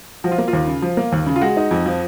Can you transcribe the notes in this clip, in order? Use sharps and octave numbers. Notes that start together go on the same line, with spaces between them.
F3 F#4
F4
A#3
F4
D#2
C#3
F3
A#3
D#2
C#3
F4
G#3 F#4
D#4
F2
F3